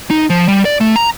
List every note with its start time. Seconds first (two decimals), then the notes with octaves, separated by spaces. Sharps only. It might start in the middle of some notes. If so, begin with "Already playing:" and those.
0.10 D#4
0.30 F3
0.48 G3
0.65 D5
0.81 A3
0.96 A#5